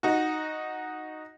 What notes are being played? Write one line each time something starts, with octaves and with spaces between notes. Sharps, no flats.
D#4 F#4